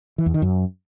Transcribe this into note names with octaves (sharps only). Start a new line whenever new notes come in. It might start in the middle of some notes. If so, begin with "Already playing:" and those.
E3
E2
D#3
F#2